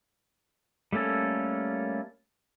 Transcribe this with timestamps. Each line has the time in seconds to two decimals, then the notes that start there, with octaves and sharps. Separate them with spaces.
0.93 G3 A3 A#3 C#4 A4